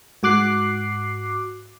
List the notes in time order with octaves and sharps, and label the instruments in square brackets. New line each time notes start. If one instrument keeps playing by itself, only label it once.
[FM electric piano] G#2 F#4 D6 F#6 C7